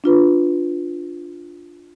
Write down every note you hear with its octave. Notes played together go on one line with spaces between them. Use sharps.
D4 F4 B4